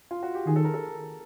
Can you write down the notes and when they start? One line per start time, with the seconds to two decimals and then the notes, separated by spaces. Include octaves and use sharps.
0.11 F4
0.23 F#4
0.35 G4
0.47 D#3 G#4
0.56 A4
0.64 A#4
0.74 A4